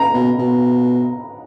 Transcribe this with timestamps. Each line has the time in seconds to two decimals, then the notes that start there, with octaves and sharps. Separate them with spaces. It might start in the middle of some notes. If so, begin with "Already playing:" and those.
Already playing: A#5
0.14 B2
0.39 B2